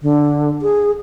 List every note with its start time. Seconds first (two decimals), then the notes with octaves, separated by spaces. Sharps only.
0.02 D3
0.62 G#4